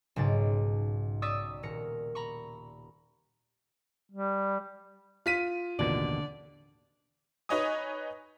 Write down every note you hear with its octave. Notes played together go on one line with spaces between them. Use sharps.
B1 G#2 C#3 A6 D7
D5 C#6 D#6 E6 A6 B6
D#1 A#4 C#7
A#5 B5 C#6
G3
F4 B6 D#7
A1 D#2 B2 D3 D5
D#4 B4 C#5 D#5 G#5 D#6